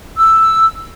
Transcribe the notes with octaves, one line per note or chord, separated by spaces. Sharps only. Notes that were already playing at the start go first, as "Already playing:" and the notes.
E6